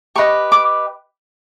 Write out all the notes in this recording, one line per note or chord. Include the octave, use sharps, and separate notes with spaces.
G4 B4 D#5 C#6
D6